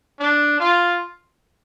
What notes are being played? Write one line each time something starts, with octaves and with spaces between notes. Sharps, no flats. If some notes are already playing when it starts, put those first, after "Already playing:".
D4
F4